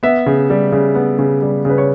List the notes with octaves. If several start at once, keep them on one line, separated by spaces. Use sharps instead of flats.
B3 E5
C#3
G3
C#3
B3
C#3
G3
C#3 B4
C#5